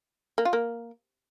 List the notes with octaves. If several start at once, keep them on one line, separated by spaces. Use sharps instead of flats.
A#3
F4
A#3